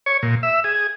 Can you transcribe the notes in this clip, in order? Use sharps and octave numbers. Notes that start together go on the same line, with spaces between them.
C#5
A#2
E5
G#4